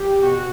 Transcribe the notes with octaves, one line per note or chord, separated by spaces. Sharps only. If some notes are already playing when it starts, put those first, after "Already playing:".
Already playing: G4
B2 F#4